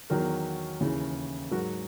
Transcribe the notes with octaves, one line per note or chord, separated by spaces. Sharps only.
E2 D#3 F#3 F#4 A#4
D#2 C#3 E3
G#2 F#3 F#4 A#4